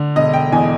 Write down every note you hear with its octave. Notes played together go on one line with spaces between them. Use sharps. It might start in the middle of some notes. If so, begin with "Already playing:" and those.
Already playing: D3
E1 D#5
G5
E2 G#5